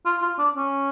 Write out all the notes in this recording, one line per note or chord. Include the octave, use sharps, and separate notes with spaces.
F4
F4
D4
C#4